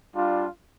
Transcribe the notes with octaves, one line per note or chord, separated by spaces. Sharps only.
G3 D4 F4